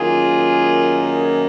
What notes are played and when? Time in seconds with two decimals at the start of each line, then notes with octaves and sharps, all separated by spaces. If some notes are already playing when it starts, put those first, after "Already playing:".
Already playing: F#2 D#3 A#3 F4 G#4